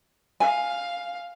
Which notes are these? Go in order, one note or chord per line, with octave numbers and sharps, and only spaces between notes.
F5 G#5